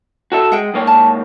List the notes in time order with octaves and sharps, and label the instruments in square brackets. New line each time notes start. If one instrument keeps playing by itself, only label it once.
[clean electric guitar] F#4 A4 E5
[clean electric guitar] G#3 [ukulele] F#5 G5
[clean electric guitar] G#2 A#3 C#5
[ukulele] A5